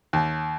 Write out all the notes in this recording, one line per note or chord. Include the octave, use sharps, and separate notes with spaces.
D#2